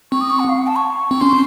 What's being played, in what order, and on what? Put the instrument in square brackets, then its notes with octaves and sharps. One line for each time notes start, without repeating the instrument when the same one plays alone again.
[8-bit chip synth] C4 [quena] C#6
[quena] D#6
C#6
F#5
F5
F#5
A5
C#6
[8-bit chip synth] C4
[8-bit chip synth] C#4 [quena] C6